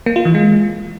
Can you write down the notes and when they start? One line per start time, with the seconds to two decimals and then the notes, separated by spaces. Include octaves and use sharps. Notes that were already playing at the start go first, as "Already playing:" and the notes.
0.06 A#3
0.16 F4
0.25 E3
0.35 G#3